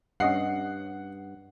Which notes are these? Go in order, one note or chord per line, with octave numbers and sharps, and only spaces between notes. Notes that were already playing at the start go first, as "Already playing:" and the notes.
G2 C#4 D#5 F#5 C7